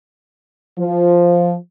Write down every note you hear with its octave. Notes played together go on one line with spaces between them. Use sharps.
F3